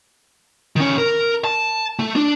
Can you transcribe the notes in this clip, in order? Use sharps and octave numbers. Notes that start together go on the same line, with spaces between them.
D#3 C#4
A#4
A5
A3
D4